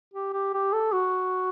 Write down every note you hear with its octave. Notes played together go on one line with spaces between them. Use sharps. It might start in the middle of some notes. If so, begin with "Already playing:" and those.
G4
G4
G4
A4
F#4